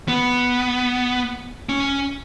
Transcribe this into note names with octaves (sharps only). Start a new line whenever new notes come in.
B3
C#4